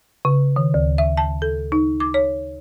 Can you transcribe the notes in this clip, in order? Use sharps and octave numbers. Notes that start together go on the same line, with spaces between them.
C#3
D#3
D2
E5
A5
A4
D#4
D6
C#5